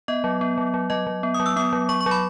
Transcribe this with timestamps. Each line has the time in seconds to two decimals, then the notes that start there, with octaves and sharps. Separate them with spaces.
0.08 B3 D#5
0.24 F#3
0.41 B3
0.58 F#3
0.74 F#3
0.90 F#3 D#5
1.07 F#3
1.23 B3
1.34 D#6
1.40 F#3
1.46 E6
1.56 B3 D#6
1.73 F#3
1.89 F#3 C#6
2.01 C#6
2.06 F#3
2.11 B5